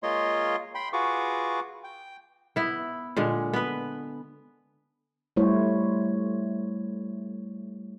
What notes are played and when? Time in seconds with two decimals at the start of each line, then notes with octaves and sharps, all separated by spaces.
0.03 G#3 A#3 F4 C#5 D#5 C6
0.75 G5 B5 C6
0.93 F4 F#4 G#4 B4 C#6 D6
1.84 G5
2.56 B3 E4
3.17 A#2 D3 G#3
3.53 B3 B4
5.36 G3 A3 E4 C5 C#5